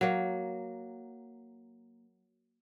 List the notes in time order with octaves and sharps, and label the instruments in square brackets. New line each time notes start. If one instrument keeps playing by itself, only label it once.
[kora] F#3 A#3